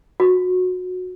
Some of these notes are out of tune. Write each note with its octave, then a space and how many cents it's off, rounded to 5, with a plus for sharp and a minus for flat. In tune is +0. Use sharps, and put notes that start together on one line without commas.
F#4 -20